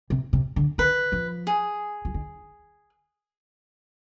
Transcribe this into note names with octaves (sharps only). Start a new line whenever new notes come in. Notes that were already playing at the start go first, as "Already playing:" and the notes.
C3
C3
D3
D#3 B4
F3
G#4
F3
D#3